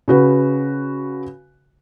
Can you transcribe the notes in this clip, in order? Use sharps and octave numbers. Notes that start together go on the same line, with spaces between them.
C#3 F#4 B4